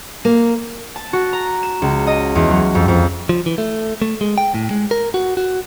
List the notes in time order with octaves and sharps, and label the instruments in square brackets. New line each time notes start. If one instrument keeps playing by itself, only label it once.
[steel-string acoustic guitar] A#3
[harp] A5
F#4
A#5
E7
C#2
D#5
E2
F#3
F2
F2
[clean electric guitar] F3
E3
A3
A3
G#3
G5
A2
G#3
A#4
F#4
F#4